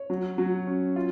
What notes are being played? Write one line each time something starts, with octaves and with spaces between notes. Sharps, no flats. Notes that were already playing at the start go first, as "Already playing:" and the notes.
Already playing: C#5
F#3
F#3
C#4
F4